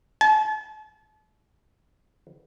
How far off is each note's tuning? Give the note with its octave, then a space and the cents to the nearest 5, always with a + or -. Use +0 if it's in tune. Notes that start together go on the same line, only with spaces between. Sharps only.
A5 -40